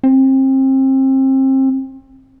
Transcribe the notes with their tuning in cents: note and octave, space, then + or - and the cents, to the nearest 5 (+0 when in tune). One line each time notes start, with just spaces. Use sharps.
C4 +30